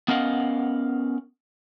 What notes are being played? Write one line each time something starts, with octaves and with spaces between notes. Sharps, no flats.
B3 C#4 A#4 D#5 F5 F#5